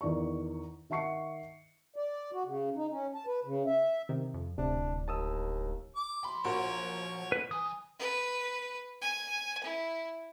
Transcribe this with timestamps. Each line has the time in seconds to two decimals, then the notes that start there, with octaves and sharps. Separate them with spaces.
0.01 E2 D#3 D5 C#6
0.90 D#3 E5 F#5 C#6 C7 C#7
1.96 D5
2.33 F#4
2.45 C#3
2.76 D#4
2.91 C#4
3.15 A5
3.27 B4
3.45 C#3
3.66 E5
4.09 C3 D#3
4.34 F2
4.58 D1 C3 D4
5.08 D#2 A5 D#6 E6
5.96 D6
6.24 F3 B5 C6
6.45 A#1 F#4 A#4 C#5
7.32 B4
7.51 E3 G#5 D#6
7.99 B4
9.01 G#5
9.63 E4